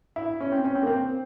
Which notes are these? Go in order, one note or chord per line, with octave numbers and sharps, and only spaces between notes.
E4
C#4
C4
C#4
C4
A#3
C4